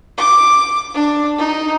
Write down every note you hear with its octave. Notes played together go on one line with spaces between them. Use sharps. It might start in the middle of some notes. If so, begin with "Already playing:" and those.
D6
D4
D#4